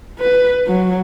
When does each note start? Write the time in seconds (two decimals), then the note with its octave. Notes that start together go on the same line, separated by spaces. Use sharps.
0.19 B4
0.66 F#3